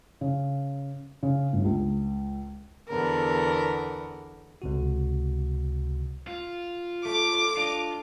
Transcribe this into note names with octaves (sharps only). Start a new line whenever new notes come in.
C#3
C#3
G1
C#2
E2 D3 B3 A#4
C#2 C3 F#4
F4
A3 D6
D4 F4 D#5